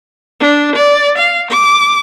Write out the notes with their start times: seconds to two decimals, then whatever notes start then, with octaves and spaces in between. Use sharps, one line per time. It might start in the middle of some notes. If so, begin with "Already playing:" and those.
0.40 D4
0.76 D5
1.18 F5
1.51 D6